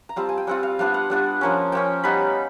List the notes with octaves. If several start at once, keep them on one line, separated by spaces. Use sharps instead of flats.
A#5
G3 C4 F4 A5
G#5
G5
G3 C4 F4 F#5
F5
G3 B3 D4 F4 F5
F#5
G3 B3 D4 F4
F3 A#3 C#4
F3 A#3 C#4 G5
G3 B3 D#4 B5